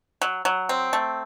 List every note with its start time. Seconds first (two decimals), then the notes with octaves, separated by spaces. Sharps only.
0.22 F#3
0.45 F#3
0.69 C4
0.93 A3